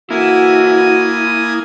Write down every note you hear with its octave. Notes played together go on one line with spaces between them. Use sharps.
D3 E3 A#3 E4 F#4 G#5 D#6